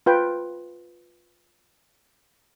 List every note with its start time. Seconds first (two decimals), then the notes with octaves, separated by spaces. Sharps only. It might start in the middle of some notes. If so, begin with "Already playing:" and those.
0.06 F4 B4 G5